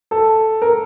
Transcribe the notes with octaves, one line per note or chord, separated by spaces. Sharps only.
A4
A#4